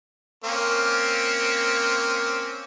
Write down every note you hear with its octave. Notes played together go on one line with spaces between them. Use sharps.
A#3 C4 C#4